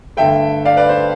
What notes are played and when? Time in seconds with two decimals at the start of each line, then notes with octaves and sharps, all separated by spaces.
0.17 G2 D3 A3 E5 G5
0.65 D5 F5
0.77 B4 D5
0.89 C5